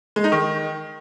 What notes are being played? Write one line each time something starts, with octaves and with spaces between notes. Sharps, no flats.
G#3
D#4
D#3